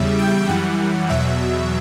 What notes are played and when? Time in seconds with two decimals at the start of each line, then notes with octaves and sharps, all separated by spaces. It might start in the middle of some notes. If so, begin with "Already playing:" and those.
Already playing: E2 C#3 G3 E5
0.19 G5
0.49 F#2 E3 G3 F#5
1.09 E2 B2 F#3 E5